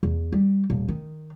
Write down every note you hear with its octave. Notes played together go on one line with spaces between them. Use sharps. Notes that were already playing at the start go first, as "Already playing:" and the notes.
E2
G3
D#1
D#3